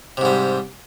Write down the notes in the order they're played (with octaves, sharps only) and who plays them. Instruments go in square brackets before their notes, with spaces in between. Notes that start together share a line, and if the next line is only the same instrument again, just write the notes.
[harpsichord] C3
G#2
G3